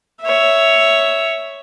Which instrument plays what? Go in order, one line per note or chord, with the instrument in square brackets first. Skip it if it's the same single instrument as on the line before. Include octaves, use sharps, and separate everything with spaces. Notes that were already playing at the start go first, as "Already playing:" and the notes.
[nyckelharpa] C#5 E5